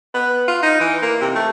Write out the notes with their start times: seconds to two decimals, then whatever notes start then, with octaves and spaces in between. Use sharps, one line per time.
0.14 B3
0.48 F4
0.63 D#4
0.80 E3
1.03 A#3
1.21 C3
1.36 A3